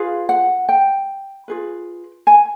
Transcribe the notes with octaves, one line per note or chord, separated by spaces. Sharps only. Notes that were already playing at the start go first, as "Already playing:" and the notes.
Already playing: F4 G#4 B4 F5
F#5
G5
F4 G#4 B4
G#5